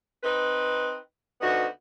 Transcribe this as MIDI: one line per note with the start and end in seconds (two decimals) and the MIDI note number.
0.24 0.96 60
0.24 0.96 63
0.24 0.96 71
1.41 1.66 38
1.41 1.66 59
1.41 1.66 63
1.41 1.66 66